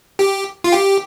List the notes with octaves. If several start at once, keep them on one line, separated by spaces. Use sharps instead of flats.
G4
F4
G4